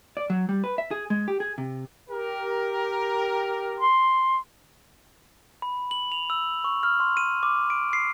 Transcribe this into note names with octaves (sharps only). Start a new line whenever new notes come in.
D5
F#3
G3
B4
E5
G#4
G#3
G4
G#4
C3
G4 A#4
C6
B5
F#7
F7
E6
C#6
F6
C6
D#7
D6
D7
C7